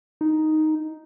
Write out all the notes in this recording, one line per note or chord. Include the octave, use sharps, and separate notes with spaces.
D#4